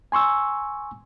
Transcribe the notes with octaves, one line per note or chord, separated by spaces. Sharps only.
G#5 C6 C#6 E6